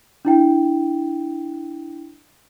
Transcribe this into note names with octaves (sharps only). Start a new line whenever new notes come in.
D4 E4 G5